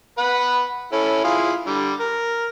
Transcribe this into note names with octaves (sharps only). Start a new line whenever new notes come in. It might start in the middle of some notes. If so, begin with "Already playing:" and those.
B4 F#5 B5
C#4 E4 A4
E4 F4 G#4
D3 G3
A#4